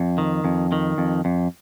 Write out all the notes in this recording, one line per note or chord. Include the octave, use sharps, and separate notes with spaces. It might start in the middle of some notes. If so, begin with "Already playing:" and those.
Already playing: F2
D#3
F2
D#3
F2
F2